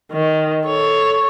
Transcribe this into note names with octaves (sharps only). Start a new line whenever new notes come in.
D#3
A4 C#5